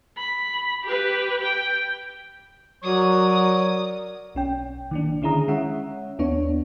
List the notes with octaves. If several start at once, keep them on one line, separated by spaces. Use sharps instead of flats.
B5
G4 B4
G5
F#3 A#4 C#5 D5 D#6
B1 C#4 G5
D#3 A#3 D4
D3 C#4 E4 G#4 A#5 D#6
G#3 C#4 C#5 E5 F#5
D#2 B3 D4 C#5